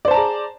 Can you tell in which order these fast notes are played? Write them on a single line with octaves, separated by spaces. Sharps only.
D5 C5 A5 A#5 G#4